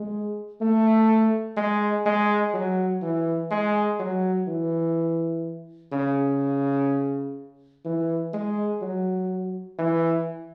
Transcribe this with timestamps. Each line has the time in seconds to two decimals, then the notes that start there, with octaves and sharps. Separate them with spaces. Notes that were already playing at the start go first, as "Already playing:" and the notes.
Already playing: G#3
0.61 A3
1.57 G#3
2.05 G#3
2.54 F#3
3.02 E3
3.51 G#3
3.99 F#3
4.47 E3
5.92 C#3
7.85 E3
8.33 G#3
8.82 F#3
9.79 E3